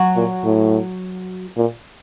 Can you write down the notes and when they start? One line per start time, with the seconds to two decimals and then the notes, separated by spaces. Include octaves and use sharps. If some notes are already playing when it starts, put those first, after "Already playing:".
Already playing: F#3 F#4
0.16 A#2
0.44 A2
1.57 A#2